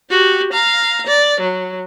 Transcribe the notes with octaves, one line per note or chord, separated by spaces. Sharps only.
F#4 G4
F5 A#5
D5
F#3